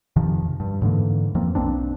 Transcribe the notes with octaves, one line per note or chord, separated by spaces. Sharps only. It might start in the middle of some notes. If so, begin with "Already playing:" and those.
F2 C3 D#3 F3
G2
G#2 D3 E3 A#3
F2 F3 A#3 C4
B1 A#3 C4 D4